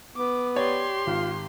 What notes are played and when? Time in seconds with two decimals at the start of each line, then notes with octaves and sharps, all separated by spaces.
0.16 B3 D6
0.56 G4 C#5 D5 C6
1.07 G#1 F4